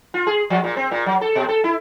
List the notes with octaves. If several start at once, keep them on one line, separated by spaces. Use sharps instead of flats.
F4
G#4
F3
A#2
C4
A#2
F#3
A4
B2
A4
E4